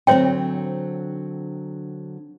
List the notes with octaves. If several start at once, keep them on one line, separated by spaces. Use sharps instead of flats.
D3 F#3 C4 C5 C#5 G5